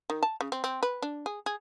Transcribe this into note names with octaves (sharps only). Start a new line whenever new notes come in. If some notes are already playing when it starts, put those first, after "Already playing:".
D#3
A5
C#3
C4
C4
B4
D4
G#4
G#4